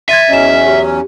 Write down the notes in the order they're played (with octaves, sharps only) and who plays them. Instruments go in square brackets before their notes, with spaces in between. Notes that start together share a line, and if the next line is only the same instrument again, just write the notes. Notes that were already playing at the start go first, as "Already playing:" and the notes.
[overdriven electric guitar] E5 [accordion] C6 [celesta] G#6 A6 D#7
[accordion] E2 F#3 C#4 [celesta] D#5 E7
[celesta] G4